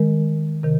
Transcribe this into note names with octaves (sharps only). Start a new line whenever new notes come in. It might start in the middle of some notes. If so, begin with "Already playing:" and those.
Already playing: D#3 G#3 A#4
C3 D#3 A#4